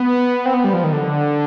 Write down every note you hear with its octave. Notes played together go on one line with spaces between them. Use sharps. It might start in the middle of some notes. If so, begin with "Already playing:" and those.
Already playing: B3
C4
B3
G3
F3
D#3
D3